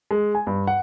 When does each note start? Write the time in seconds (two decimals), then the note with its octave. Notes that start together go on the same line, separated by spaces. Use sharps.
0.11 G#3
0.35 G#5
0.47 G2
0.67 F#5